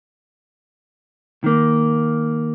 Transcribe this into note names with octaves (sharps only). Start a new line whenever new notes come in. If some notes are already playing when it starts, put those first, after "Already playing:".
D#3 A#3